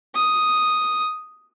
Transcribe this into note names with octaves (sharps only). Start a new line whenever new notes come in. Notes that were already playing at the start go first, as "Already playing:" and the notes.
D#6